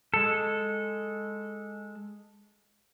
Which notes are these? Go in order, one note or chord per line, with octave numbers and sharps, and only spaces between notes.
G#3 A4